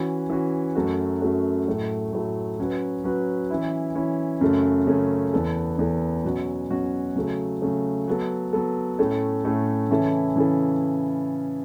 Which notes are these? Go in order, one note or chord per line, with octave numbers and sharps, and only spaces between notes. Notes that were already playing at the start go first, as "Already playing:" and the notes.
Already playing: E3 C#4 F#4
E3 C#4 F#4
F#2 F#3 A3 F#4
F#2 F#3 A3 F#4
A2 F#3 A3
A2 F#3 A3
F#3 C#4 F#4 B4
F#3 C#4 F#4 B4
E3 C#4 E4
E3 C#4 E4
F#2 C#3 A3 C#4
F#2 C#3 A3 C#4
E2 E3 B3 A4
E2 E3 B3 A4
B2 F#3 C#4 F#4
B2 F#3 C#4 F#4
C#3 F#3 A3
C#3 F#3 A3
F#3 B3 A4
F#3 B3 A4
A2 A3 C#4 A4
A2 A3 C#4 A4
C#3 E3 C#4 E4 A4
C#3 E3 C#4 E4 A4